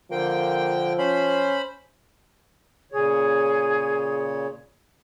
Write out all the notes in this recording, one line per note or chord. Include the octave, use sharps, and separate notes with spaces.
D3 F3 A#3 G5
C#4 C5 B5
A#2 C#3 G#4 C#5